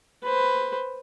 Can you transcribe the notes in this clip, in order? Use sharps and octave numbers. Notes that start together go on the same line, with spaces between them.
B4 C5